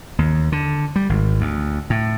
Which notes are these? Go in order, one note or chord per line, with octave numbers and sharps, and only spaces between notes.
D#2
D3
G3
G#1
D2
A2